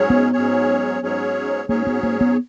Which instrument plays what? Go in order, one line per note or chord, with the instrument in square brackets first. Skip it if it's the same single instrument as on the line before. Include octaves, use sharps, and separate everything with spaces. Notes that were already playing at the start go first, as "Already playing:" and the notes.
Already playing: [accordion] G#2 F#3 C#4 G#4 C#5
[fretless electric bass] B3
[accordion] G#2 F#3 C#4 G#4 C#5
G#2 F#3 C#4 G#4 C#5
[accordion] G#2 F#3 C#4 G#4 C#5 [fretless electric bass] A#3
[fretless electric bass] B3
A#3
B3